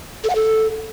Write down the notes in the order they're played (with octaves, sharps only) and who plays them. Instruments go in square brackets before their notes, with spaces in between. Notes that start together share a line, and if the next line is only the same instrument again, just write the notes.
[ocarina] A4
F#5
A4